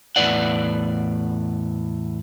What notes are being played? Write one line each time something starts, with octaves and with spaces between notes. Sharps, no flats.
E2 A2 B4 D5 F#5